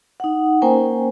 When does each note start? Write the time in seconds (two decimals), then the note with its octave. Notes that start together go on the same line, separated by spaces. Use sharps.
0.20 D#4 F#5
0.62 A#3 C#4 A#4 C5 G5 G#5